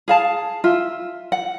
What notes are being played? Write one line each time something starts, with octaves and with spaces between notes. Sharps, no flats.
G#4 F5 A5
F4 E5
F#5